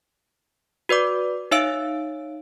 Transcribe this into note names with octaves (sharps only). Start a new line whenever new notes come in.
F#4 B4 D5 D6
D#4 C#5 E5 F5 E6 D7